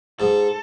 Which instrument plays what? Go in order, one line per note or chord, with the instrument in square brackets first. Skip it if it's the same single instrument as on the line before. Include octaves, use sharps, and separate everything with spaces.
[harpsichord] G#2 [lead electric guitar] A4